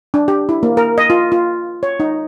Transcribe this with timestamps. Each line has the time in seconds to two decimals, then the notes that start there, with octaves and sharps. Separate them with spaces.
0.14 D4
0.28 G4
0.49 E4
0.63 A#3
0.77 A#4
0.98 D#5
1.10 F4
1.32 F4
1.83 C#5
2.00 D#4